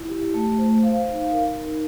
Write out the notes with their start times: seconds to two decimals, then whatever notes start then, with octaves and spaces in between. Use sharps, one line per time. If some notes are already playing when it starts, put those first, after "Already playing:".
Already playing: E4
0.09 G4
0.34 A3
0.58 C5
0.83 F5
1.08 D#4
1.32 A#4
1.57 D#4